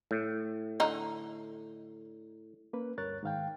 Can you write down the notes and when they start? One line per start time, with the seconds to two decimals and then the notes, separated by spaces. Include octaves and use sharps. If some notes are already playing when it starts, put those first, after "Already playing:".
0.11 A2
0.80 D3 D#4
2.73 A#3 C#4 B4
2.98 D2 G2 A#4 C#5 F#6 A6
3.23 G#2 D#3 F5 G5